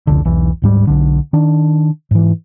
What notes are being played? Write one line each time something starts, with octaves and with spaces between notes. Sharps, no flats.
F1 C#2 D3
E1 B1 E3
D1 G#2 G3
B1 D3
D#3 D4
G#2 E3